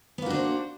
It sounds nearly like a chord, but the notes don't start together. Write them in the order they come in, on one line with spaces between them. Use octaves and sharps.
B3 A#3 F#4 D4 C5